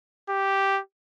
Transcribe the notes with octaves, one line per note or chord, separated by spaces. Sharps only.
G4